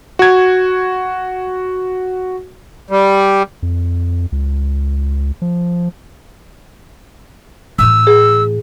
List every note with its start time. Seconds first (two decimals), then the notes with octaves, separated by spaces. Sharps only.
0.19 F#4 G#6
2.90 G3
3.63 F2
4.32 C#2
5.42 F3
7.79 A2 E3 E6
8.07 G#4